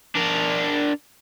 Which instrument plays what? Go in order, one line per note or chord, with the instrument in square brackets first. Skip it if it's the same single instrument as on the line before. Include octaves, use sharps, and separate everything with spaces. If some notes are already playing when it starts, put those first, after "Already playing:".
[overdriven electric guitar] D4 A#4